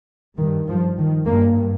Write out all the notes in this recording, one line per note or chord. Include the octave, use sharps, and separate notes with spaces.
G2 D#3
F3
D#3
G2 A#3